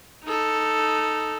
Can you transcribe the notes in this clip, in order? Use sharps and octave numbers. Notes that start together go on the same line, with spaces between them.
D#4 A4